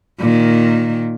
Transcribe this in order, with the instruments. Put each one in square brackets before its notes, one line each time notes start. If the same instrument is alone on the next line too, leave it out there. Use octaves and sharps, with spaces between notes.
[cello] A#2 D#3